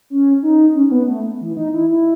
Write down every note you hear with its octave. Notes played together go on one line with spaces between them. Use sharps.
C#4
D#4
C#4
C#4
B3
A3
E3
D#4
E4
E4